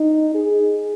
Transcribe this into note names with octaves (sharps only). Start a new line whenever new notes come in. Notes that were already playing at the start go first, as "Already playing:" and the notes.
Already playing: D#4
G#4